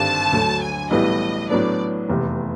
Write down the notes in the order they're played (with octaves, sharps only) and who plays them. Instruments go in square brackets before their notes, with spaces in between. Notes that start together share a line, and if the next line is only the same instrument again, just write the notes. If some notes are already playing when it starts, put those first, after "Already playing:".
Already playing: [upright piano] G#1 G2 D3 G3 C4 [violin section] A5
[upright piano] D2 D3 F#3
[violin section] G#5
[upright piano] B1 A2 E3 G3 B3 [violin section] D#5
[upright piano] A2 F#3 B3 D4 [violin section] D5
[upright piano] F1 E2 C3